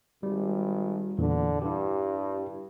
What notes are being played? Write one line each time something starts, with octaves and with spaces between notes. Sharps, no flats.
G#1 G3
E2 A#2 D3 E3
G2 E4 G4